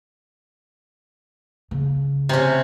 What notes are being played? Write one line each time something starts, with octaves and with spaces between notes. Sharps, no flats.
C#3
C3 C#4